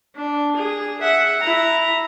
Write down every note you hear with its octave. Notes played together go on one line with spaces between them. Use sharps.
D4
G#4
E5 F#5
E4 A#5